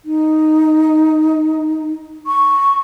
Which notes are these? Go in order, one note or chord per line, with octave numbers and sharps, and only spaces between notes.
D#4
C#6